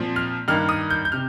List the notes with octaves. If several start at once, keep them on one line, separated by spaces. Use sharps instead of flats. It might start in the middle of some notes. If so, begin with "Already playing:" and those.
Already playing: A#2 F3 C4
F6
G2 D#3 A#3 D4 F6
D#6
G6
G6
C3 F6